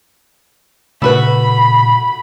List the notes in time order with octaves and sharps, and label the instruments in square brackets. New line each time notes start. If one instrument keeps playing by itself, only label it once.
[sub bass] A#2 [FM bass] C#3 [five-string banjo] A3 F#4 B4 [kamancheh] B5